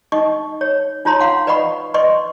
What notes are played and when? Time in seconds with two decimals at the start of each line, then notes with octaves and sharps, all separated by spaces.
0.12 D#4 D#5 C#6
0.61 C#5
1.05 D#4 F4 C#5 A#5 C6
1.21 F5 F#5 C6
1.47 B4 D5 D#5 F#5 B5 C#6
1.94 B4 D5 D#5 C6 C#6